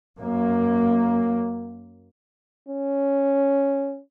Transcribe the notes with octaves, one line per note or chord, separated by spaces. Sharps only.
F#2 A#3
C#4